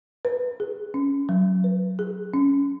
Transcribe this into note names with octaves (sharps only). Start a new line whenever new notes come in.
B4
G#4
C#4
F#3
B4
G#4
C#4